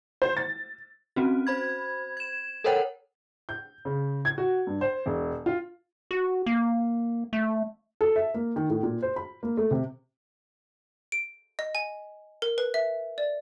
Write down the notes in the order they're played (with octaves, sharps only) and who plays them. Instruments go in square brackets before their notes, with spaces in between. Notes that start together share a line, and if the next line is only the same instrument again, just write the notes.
[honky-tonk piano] C5
A6
[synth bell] C4 C#4 F#4
C5 B5 G#6
G#6 E7
A4 A#4 C5 C#5 F#5 G5
[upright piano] G6
C#3
G#6
F#4
G2
C5
E1
F4
[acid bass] F#4
A#3
A3
[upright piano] A4
E5
A#3
D#3
A2
A#2
C5
B5
A#3
A3
C3
[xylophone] D7
D#5
G#5
A#4
B4
E5
D5